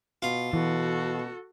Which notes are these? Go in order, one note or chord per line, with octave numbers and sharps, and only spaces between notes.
B2 F4
B2 E3 F#4 A4